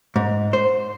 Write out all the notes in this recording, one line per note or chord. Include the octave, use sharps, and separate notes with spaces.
G#2
C5